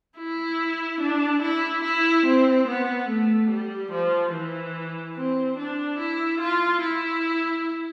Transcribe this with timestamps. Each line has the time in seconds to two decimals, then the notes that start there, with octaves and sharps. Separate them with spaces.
0.17 E4
1.00 D4
1.41 E4
1.83 E4
2.26 C4
2.67 B3
3.08 A3
3.49 G3
3.91 F3
4.33 E3
5.15 C4
5.57 D4
5.98 E4
6.40 F4
6.81 E4